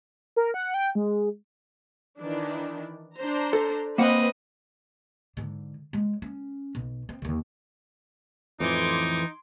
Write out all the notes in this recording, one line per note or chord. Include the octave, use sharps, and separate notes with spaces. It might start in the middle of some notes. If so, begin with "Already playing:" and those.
A#4
F#5
G5
G#3
D#3 E3 D4
D4 C5 A#5
A4
A#3 C4 B4 D#5 F#5
G#2 D3
G#3
C#4
B1
C4
D#2 D3
F2 A2 E3 D#4 C6 D6 G#6